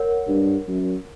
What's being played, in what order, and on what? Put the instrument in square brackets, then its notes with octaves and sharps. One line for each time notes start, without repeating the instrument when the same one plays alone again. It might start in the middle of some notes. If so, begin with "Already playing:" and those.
Already playing: [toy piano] A#4 C#5 F#5
[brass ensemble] G2
F#2